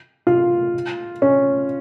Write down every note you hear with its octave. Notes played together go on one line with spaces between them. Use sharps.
F4
C#4